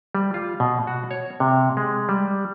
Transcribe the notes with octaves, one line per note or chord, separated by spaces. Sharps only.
G3
F4
B2
F#4
C#5
C3
G#3
G3